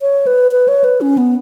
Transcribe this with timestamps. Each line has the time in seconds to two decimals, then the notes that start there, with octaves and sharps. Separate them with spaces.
0.01 C#5
0.27 B4
0.51 B4
0.68 C#5
0.84 B4
1.01 C#4
1.17 B3